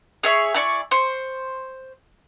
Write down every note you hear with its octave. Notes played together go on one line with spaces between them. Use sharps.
G#4 C#5 E5
E4 G#4 D5 C#6
C5 C#6